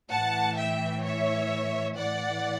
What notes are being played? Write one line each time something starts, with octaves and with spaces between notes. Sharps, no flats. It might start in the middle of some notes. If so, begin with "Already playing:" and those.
A2 E3 F#5 A5
E5 G5
C#5 E5
A2 E3 D5 F#5